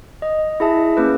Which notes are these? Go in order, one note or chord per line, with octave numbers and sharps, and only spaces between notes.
D#5
E4 G#4 E5 A5
A#3 C#4 G#4 B4